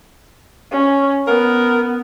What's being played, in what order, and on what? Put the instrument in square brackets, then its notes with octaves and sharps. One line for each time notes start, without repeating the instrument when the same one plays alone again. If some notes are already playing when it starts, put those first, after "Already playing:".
[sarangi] C#4
[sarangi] B3 [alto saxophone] A#4